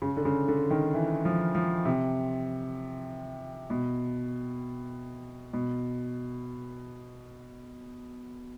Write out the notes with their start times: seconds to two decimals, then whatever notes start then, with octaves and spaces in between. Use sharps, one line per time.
0.02 C#3
0.17 D3
0.25 C#3
0.48 D3
0.70 D#3
0.94 E3
1.25 F3
1.55 F3
1.85 C3
3.70 B2
5.53 B2